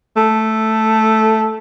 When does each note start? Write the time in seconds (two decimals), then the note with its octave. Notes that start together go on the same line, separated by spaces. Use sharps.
0.17 A3